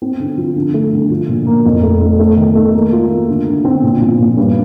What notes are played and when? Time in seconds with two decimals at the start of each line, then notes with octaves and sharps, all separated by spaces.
0.02 C4
0.20 D3
0.38 F3
0.56 D3
0.74 A3
0.92 D3
1.10 F3
1.28 A#2
1.46 A#3
1.65 F2
1.83 A3
2.01 A3
2.19 A3
2.37 D#3
2.55 A3
2.74 A#3
2.92 F4
3.10 A#3
3.29 D3
3.47 D3
3.65 C4
3.83 A#2
4.01 F3
4.19 A#2
4.37 G2